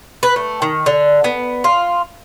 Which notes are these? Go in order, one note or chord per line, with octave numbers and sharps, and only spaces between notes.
B4
A3
D#3
D3
B3
F4